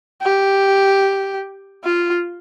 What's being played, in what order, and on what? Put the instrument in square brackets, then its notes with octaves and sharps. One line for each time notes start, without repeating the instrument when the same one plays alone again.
[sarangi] G4
F4